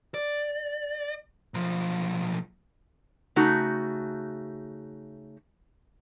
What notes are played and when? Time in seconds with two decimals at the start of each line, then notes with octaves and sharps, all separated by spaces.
0.14 D5
1.54 B1 F3
3.36 C#3 A3 D#4 F#4